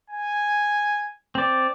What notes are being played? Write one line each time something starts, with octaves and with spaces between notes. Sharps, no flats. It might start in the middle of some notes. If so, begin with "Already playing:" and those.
G#5
C4 D5